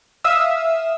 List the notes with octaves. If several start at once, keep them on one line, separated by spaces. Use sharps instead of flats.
E5 F5 D#6 E6